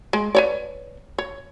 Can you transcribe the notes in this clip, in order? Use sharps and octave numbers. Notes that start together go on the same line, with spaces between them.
G#3
B4 C#5 D5
C#5